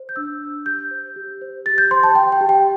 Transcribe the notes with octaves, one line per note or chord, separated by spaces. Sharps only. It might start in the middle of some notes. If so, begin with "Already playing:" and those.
Already playing: C5
G6
D4 E6
D4
G4 G6
C5
G4
C5
G4 A6
G6
C5 C6
A5
G4 G5
G5
G4
G5